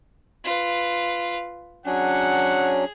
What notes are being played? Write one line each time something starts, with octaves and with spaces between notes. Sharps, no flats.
F4 B4
F#3 C#4 D4 G#4 F#5